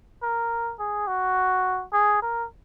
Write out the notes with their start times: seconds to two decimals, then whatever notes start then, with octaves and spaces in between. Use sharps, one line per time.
0.23 A#4
0.79 G#4
1.08 F#4
1.93 G#4
2.22 A#4